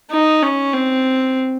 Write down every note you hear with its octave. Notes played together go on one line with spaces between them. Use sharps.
D#4
C#4
C4